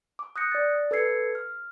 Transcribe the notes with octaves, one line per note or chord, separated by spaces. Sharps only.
D6
D#6 F#6 G6 A#6 C#7
D5 A6
A4 B4 E6 G#6 C7 C#7
F6